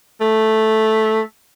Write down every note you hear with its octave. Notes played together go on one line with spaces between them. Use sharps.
A3